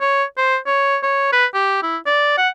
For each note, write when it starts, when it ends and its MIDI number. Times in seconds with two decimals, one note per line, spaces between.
0.01 0.24 73
0.37 0.57 72
0.67 0.98 73
1.03 1.30 73
1.32 1.46 71
1.54 1.80 67
1.83 1.97 64
2.06 2.37 74
2.38 2.48 78